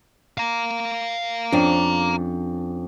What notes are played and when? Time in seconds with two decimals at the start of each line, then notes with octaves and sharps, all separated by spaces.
0.38 F5 A#5
1.52 F2 C#4 D4